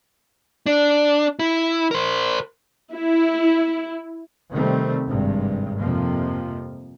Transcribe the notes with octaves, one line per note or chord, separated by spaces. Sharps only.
D4
E4
A#4 C5
E4
C3 D#3 G3 A3 C4
G#1 G2 C3
F2 C3 F3 A#3